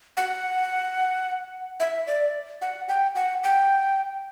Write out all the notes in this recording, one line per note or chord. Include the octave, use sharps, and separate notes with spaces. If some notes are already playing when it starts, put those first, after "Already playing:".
F#5
E5
D5
F#5
G5
F#5
G5